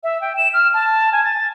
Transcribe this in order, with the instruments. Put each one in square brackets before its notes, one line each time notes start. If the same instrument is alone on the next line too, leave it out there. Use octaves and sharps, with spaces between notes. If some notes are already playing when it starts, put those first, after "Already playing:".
[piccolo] E5
G5
E7
F6
A5
G#5
A6